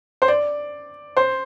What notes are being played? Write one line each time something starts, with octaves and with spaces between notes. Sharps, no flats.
C5
D5
C5